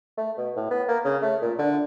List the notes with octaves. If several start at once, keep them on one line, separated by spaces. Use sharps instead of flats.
A3
B2
A2
B3
A#3
C#3
A3
A#2
D3